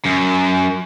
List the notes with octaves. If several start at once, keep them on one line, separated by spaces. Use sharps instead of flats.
F#2